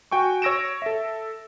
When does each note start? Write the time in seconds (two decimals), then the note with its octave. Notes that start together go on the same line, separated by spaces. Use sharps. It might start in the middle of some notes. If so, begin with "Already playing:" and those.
0.11 F#4 G5 G#5 C#6
0.42 C#5 E6 A#6 D7 E7
0.82 A4 E5